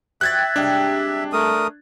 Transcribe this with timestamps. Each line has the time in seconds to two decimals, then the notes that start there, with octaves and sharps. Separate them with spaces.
0.21 F3 F#4 E5 G5 F#6 G#6 A6
0.56 C3 G3 G#3 D4
1.33 A3 A#4 D#6